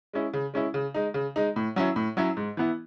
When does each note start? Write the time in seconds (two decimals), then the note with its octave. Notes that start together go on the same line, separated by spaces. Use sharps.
0.13 G#3 C#4 E4
0.34 C#3
0.54 G#3 C#4 E4
0.74 C#3
0.94 G#3 D#4
1.14 C#3
1.36 G#3 D#4
1.56 A2
1.76 F#3 C#4 E4
1.96 A2
2.17 F#3 C#4 E4
2.37 G#2
2.57 E3 B3 E4